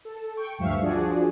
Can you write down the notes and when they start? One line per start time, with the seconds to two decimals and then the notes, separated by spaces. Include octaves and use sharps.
0.05 A4
0.37 G5 C#6
0.58 D2 G2 F3 E5 F5 C#6
0.82 F3 D4 F#4 G#4 D5